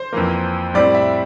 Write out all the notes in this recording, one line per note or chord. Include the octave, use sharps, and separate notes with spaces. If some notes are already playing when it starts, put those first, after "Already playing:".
Already playing: C5
F2 E3 A#3
A2 G3 C4 D5
E5